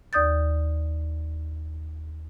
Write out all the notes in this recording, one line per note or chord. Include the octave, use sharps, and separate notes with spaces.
D#2 D5 D#6 G6 A6